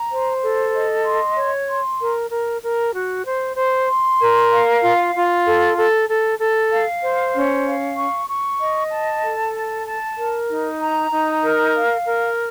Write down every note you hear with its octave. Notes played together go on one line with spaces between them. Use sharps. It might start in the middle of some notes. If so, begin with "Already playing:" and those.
Already playing: A#5
C5
A4
D#5
C6
C#5
C6
A#4
A#4
A#4
F#4
C5
C5
C6
A#4
F5
F4
F4
A4
A4
A4
A4
F5
C5
C#4
F5
C#6
C#6
D#5
A5
A4
A5
A5
A#4
D#4
A#5
D#4
A#4
F5
A#4